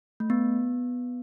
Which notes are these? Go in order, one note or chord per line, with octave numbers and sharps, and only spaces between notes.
A3
B3